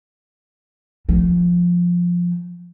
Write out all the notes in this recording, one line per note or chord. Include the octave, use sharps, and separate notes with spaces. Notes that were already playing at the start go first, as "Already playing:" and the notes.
F3 A3